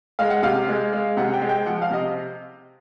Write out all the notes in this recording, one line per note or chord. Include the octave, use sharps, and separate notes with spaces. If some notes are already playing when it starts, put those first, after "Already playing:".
G#3 F5
F#5
C3 F5
G#3
G#3
C3 F#5
G5
G#3
G5
F3 F#5
F5
C3 D#5